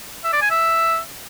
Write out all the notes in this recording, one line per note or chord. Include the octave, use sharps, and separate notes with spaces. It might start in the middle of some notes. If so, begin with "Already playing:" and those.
E5
D5
G#5
E5